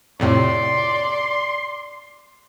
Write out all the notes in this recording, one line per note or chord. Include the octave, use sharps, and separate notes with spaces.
F2 A2 C3 D5 C6